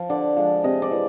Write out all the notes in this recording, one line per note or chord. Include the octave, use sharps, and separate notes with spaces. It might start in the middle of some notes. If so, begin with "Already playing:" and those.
Already playing: F3
D3 D5
F3 G#3
C3 D#5
D5
E3